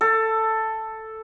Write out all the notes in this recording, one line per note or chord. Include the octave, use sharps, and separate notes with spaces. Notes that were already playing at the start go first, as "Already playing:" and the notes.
A4